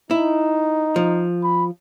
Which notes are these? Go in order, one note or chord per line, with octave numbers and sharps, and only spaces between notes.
D#4 E4
F3
B5